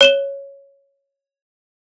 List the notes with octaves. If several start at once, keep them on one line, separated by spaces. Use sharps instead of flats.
C#5 E7 G7